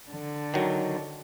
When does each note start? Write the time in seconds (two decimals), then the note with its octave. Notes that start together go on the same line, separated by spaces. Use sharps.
0.10 D3
0.54 D#3 F#3